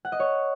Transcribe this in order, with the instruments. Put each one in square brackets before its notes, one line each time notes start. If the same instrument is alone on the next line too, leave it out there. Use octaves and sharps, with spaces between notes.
[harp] F#5
D#5
C#5